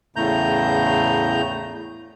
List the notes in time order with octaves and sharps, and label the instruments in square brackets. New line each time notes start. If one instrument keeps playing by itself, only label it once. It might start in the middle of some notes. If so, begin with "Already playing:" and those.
[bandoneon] E2 A2 C#3 A3 A#5 G6